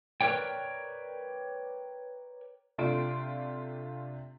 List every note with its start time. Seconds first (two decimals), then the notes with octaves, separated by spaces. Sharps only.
0.21 A#4 B4 C#5 D5 G5
2.78 C3 A3 D4 F4 C6 D7